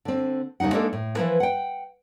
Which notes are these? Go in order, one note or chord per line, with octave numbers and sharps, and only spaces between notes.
D3 C4
D#2 C#3 G3 D#4 F#5
G#3 A#3 D4 D#4 A4 A#4
A2
E3 F3 G#3 E4 A#4 B4
F#5 G5